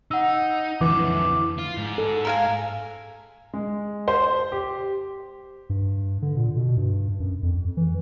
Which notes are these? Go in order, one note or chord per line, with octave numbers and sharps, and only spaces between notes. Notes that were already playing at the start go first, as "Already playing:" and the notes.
D#4 F#5 E6
F2 D3 E3 D6
F4
G#2
A4
A#4 F5 G#5
G#3
C5
G4
G2
D3
A#2
B2
G2
F#2
F2
E3